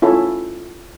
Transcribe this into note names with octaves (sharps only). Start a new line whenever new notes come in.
C#4 E4 F4 A4